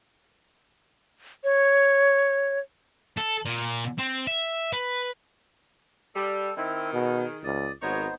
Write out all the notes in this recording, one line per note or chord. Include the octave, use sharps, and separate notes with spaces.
C#5
A4
A#2
C4
E5
B4
G3 A4
D#3 C4 E4
B2 G#4
C#2 D5 D#6
G#1 F#3 B3 D#4 A#4 C5 C#5